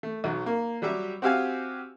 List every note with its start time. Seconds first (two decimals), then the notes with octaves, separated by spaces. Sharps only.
0.03 A3
0.24 B1 F#3
0.46 A#3
0.82 F#3 G3 G4 E5
1.22 C4 F#4 G4 E5 F5 G#5